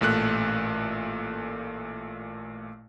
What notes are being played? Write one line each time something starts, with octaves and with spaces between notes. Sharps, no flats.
A1 A#2 A3 F#6